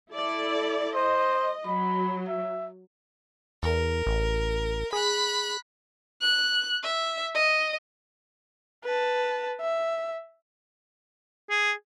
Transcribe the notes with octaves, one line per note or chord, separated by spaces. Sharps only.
E4 A4 D5
C5 D#5
F#3 B5
E5
E2 A#4
A1
G#4 B5 F#6
F#6
E5
D#5
B4 A5
E5
G#4